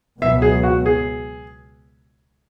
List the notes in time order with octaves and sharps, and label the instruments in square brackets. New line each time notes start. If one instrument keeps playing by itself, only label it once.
[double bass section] C#2 B2 F#3 B3 [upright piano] E5
[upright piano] G#4
F#4
G#4